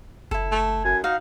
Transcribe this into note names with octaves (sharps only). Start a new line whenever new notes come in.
F#1 E4 A4
A3
F#2 G#5
D#4 F#4 F5